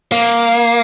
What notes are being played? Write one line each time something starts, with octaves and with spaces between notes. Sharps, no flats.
A#3